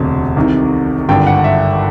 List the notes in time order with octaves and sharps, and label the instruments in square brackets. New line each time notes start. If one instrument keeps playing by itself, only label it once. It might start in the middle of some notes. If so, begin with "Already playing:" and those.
Already playing: [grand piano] E1 D2 C3
C2 C3 D#3
G#1 G2 D3 G5
F#5
E5